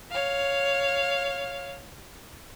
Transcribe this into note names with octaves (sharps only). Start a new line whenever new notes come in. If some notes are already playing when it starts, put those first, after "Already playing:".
C#5 F5